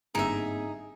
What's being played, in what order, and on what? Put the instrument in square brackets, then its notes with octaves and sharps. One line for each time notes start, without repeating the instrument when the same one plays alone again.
[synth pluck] G1 D7 [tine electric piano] G#2 A#3 C4 [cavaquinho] D#4 E5 [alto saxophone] G#4